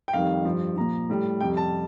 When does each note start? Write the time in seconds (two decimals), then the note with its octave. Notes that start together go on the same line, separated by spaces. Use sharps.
0.08 G5
0.13 F2 D#3 G3 F5
0.45 G2 F3
0.76 A#2 F3 A#5
1.09 A2 G3
1.41 F2 C3 G3 G5
1.57 A5